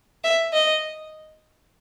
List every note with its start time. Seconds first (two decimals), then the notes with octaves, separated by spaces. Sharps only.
0.24 E5
0.53 D#5